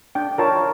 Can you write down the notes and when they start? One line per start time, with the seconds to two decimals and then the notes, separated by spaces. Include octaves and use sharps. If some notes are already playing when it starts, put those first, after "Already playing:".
0.15 D4 G5
0.38 F4 A#4 C#5 A5